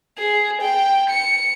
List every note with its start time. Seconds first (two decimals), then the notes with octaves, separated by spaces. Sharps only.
0.18 G#4
0.61 G5
1.10 C#7